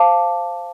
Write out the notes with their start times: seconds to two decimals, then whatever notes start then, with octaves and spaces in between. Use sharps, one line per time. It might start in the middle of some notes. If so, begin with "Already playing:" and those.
Already playing: C5 F5 A5 D6